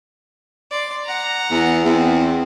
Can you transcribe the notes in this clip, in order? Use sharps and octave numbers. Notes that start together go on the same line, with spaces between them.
D5 C6
F#5 A#5
E2
E2 C4